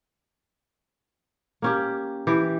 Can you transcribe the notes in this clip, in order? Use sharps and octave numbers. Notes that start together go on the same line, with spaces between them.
A#3 C#4 G4
E3 G4